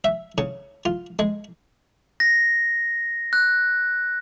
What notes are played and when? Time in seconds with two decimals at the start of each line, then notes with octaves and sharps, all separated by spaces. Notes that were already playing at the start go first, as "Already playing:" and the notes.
0.04 E5
0.38 C#3
0.85 F4
1.19 G#3
2.20 A#6
3.33 F#6